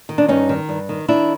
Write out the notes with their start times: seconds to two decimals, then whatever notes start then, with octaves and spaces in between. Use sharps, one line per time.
0.09 D#3
0.18 D4
0.28 G2 C#4 D#4
0.49 D#3
0.69 G2
0.89 D#3
1.08 D#3 D4 E4